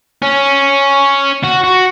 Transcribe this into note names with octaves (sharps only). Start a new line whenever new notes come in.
C#4
F#4
F#4